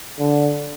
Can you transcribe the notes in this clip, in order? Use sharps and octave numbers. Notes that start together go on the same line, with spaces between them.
D3